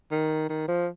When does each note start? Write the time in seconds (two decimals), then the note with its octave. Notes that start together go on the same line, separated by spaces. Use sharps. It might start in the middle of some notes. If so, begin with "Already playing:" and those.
0.11 D#3
0.49 D#3
0.68 F3